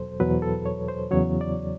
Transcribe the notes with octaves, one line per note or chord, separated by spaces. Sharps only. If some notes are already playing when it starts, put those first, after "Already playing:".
Already playing: E2 B2 F#3 A4 C5
E2 B2 F#3 B4
A4
C#5
C5
E2 C#3 F#3 C#5
D5